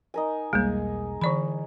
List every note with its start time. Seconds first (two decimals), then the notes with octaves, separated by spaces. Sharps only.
0.14 D#4 A#4 G#5
0.53 E1 B1 G3 G#3 A#3 G#4
1.21 D3 E3 D5 B5